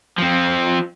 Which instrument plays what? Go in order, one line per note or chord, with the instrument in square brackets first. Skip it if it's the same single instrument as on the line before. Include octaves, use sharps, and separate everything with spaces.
[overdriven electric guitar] F3 C4